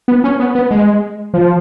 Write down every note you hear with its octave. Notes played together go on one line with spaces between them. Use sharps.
B3
C#4
B3
B3
G#3
F3